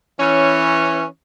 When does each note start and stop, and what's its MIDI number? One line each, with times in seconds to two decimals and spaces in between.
0.20 1.04 52
0.20 1.04 61